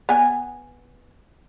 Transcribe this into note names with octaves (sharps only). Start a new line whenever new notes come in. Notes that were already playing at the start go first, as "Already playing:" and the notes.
B3 G#5